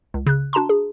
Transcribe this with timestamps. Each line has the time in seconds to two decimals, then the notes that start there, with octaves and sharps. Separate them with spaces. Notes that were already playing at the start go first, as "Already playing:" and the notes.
0.14 C#2
0.26 C#3 F#6
0.53 D4 F#4 A5 A#5 C6
0.69 G#4